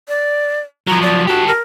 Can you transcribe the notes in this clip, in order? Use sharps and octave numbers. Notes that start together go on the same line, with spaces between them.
D5
F3 F#3 A#5
D5
F#4 G4 A4
A#4